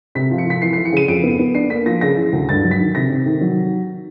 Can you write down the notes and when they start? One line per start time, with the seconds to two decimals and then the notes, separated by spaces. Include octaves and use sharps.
0.15 C3 B6
0.31 F3
0.38 C#7
0.46 F3 B6
0.62 E3 C7
0.73 C7
0.78 E3
0.85 C#7
0.92 C#3 D#7
1.08 F2 D7
1.24 B3
1.39 B3
1.55 D4 C7
1.70 A#3 B6
1.86 F3 A#6
2.01 C#3 A#6
2.17 E3
2.32 D2
2.49 G2 A6
2.63 F#3
2.71 B6
2.79 D#3
2.95 C3 A#6
3.10 C3
3.26 D#3
3.41 F#3